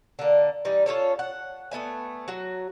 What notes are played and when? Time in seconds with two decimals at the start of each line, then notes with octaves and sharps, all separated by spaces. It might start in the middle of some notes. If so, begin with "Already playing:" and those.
0.19 D3 A#3
0.65 E3 G3 D#4
0.86 C#4 F4 A4 C#5
1.19 F#5
1.71 A3 B3 E5 G#5
2.28 F#3 F#4